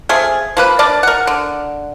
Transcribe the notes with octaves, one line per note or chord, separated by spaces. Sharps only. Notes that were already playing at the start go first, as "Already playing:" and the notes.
A3 C4 F4 G#4
F3 A#3 B4
D4 A#4 D5 A5
A#4 F#5
D3